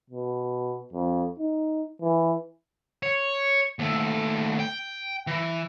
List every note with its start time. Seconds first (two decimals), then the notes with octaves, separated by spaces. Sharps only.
0.10 B2
0.93 F2
1.39 D#4
2.02 E3
3.03 C#5
3.79 D#2 A3
4.59 G5
5.27 E3